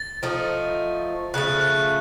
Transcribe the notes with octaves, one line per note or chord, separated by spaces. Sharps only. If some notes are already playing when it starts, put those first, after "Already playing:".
Already playing: A6
F3 A3 D#4
C#3 F3 A3 F#6
F#6